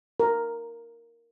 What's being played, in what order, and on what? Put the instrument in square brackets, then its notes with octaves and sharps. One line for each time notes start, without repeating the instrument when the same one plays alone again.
[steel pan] A#4